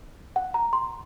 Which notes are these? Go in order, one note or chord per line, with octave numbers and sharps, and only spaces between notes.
F#5
A#5
C6